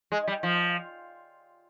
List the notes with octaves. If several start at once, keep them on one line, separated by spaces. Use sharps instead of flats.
G#3
G3
F3